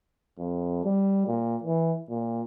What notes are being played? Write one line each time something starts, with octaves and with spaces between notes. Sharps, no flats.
F2
G3
A#2
E3
A#2